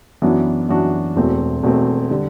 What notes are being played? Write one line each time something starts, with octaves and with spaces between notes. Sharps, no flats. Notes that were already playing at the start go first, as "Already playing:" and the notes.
F#2 E3 B3 D4 F#4
F#2 E3 B3 D4 F#4
E1 E2 B2 A3 C4
E1 E2 B2 A3 C4
D3 G3